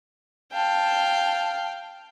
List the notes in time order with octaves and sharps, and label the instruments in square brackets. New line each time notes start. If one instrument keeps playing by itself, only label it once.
[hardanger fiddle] F5 G5 [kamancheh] A5